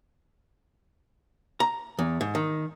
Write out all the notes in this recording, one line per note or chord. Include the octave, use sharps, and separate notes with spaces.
A#5
E2
G#2
D#3